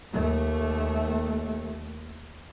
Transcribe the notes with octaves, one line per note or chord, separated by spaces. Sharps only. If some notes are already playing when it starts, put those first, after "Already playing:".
D#2 A3